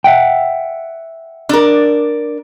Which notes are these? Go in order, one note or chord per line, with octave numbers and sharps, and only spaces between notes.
E5 F#5 G5
D4 A#4